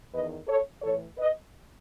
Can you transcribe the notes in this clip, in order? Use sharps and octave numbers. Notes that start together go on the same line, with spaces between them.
E2 D#3 B4 D#5
A4 C#5
A2 E3 A4 C#5
B4 D#5